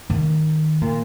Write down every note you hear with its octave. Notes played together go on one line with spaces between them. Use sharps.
D#3
A#2